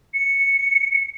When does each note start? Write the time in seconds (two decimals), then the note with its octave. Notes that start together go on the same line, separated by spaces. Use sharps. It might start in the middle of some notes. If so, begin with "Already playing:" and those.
0.14 C#7